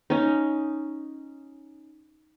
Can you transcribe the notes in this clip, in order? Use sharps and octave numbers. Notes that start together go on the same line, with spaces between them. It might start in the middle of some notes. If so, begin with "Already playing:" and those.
C#4 D#4